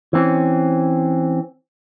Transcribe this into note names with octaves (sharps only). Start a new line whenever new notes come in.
E3 C4 C#4